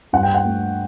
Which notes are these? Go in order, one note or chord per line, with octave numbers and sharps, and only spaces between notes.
G2 F#5
G5
F#5
A3